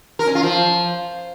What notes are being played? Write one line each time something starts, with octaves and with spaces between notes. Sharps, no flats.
A#4
C#4
F4
F3